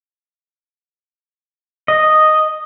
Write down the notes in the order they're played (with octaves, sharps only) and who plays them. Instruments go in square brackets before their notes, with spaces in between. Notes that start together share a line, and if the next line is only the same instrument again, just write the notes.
[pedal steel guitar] D#5